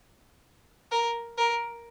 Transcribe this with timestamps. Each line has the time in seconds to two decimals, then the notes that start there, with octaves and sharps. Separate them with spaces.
0.91 A#4
1.37 A#4